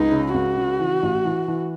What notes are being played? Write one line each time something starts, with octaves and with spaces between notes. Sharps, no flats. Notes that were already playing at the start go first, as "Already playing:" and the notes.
Already playing: C#2 D#4
C#3
C#2 F#4
C#3
E3
A1
E3
E3